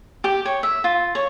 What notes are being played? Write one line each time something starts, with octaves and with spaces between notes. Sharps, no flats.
G4
C#5
E5
F4
C#5